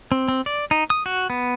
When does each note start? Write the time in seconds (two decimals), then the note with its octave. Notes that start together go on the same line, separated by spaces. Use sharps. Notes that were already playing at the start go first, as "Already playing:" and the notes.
0.12 C4
0.28 C4
0.46 D5
0.71 D#4
0.90 D#6
1.06 F#4
1.30 B3